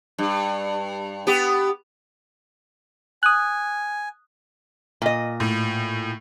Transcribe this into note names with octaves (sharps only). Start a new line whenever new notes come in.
G2
B3 G4
G#5 D#6 F#6
A#2 D#5
A2